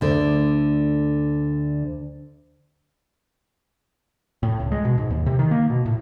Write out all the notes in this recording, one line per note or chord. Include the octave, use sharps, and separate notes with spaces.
D2 D3
A2
C#2
G#3
B2
G#2
D#2
C3
D#3
A#3
B2
A2